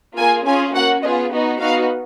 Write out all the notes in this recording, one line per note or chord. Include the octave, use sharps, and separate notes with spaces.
A#3 F4 G#4 G#5
C#4 F4 G#4 G#5
A#3 C#4 F#4 F#5
B3 F4 G#4 D#5
B3 D#4 F#4
B3 D#4 F#4 F5